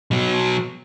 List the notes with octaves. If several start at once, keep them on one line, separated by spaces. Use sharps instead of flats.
B2 F#3